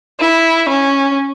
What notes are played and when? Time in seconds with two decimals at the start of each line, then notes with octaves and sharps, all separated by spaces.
0.20 E4
0.69 C#4